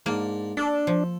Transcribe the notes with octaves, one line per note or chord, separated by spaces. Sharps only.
G#2 A#3 D4
D4 A4
F3